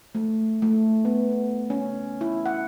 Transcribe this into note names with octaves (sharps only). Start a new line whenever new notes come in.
A3
A3
B3
C#4
E4
F#5